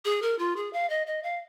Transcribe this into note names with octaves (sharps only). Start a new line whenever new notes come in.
G#4
A#4
F4
G#4
F5
D#5
D#5
F5